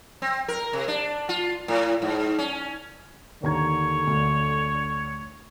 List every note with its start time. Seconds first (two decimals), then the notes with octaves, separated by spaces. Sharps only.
0.22 C4
0.48 A#4
0.73 C3
0.88 D4
1.29 F4
1.68 A2
2.02 G#2
2.39 C#4
3.43 D#2 D3 C#5 A#5 G#6
4.07 D2